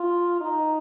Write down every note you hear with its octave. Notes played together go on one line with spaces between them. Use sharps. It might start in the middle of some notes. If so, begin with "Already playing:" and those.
Already playing: F4
D#4